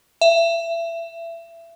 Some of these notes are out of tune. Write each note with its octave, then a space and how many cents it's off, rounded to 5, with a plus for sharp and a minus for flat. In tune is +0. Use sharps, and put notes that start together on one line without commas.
E5 +25